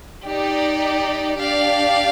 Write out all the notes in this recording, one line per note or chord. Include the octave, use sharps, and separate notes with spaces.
D#4 G4 D5
D4 G4 D5 F5